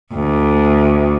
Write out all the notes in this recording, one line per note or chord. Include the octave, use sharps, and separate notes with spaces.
D2